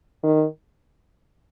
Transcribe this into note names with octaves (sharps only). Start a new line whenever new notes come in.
D#3